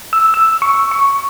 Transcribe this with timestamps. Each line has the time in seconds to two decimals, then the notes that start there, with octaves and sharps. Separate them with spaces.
0.13 E6
0.34 E6
0.62 C#6
0.91 C#6